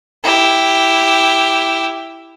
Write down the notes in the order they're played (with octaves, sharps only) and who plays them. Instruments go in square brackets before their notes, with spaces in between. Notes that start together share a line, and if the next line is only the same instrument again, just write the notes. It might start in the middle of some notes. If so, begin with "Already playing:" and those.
[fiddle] E4 G4